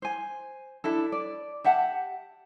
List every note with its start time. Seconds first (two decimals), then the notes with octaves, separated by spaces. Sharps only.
0.02 C5 G#5
0.84 D4 E4 A4
1.12 D5
1.64 G4 E5 F#5 A5